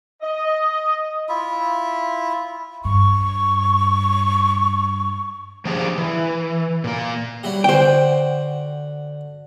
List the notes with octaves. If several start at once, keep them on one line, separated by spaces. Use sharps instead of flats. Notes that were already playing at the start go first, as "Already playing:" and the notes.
D#5
E4 F4 E5
G2 C#6
F3 A#3 D4 G4 G#4
E3
A#2 A#3
F#3 G3 E4
D3 F#4 C5 G5